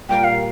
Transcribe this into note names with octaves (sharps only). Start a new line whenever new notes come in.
A#2 G3 A#3 F4 A#4 G5
F5